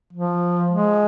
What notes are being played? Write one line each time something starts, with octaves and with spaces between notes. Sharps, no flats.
F3
G#3